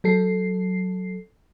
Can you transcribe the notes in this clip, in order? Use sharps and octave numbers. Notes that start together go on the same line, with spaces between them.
F#3 A4 C7